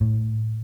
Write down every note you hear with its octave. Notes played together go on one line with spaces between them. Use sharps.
A2